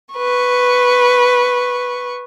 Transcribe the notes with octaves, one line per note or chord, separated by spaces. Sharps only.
B4 C#6